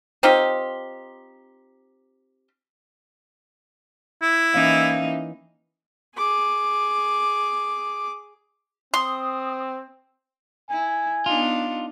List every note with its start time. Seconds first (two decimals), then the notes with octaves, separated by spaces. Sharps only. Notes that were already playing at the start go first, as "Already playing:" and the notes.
0.23 C4 D#4 F4 G4
4.22 E4
4.54 E3 A#3 C#4 D#4 E5 F5
6.16 G#4 D6
8.94 C4 C6 D#6
10.70 E4 G#5
11.26 B3 D4 D#4 F4